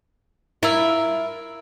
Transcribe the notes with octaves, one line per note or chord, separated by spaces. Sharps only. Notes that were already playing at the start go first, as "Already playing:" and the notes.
E4 F4 A#4 E5